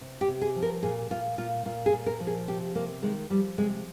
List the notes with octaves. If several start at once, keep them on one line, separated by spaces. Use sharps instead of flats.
C3
G4
C3
G#4
F3
A#4
A#2 G#4
A#2 F4
A#2 F4
A#2 F4
G#4
A#2
A#4
F3
G#4
C3 G4
C3 A#3
D#3 G#3
F3 G3
C3 G#3